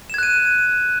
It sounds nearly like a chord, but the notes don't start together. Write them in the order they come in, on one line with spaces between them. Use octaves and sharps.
E7 G#6 F#6 D#7